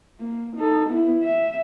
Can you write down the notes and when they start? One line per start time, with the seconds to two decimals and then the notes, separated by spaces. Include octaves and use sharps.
0.20 A#3
0.56 D#4 A4
0.89 B3 E4
1.23 E5